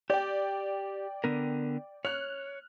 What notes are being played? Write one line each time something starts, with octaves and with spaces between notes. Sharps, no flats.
G4 D5 G5
D3 B3 A#4
C#5 F6 F#6